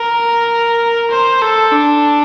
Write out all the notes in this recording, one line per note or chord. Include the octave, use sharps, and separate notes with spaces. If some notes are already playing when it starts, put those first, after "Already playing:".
Already playing: A#4
C5
A4
D4